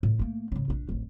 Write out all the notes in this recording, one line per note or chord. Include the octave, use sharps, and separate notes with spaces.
A2
A3 A#3
G#1 C#3
A#1 D4
D1 A1